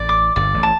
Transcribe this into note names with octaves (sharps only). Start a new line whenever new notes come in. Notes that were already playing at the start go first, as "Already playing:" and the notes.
Already playing: A1 A2 D5
D6
G1 G2 D5
A1 A2
A5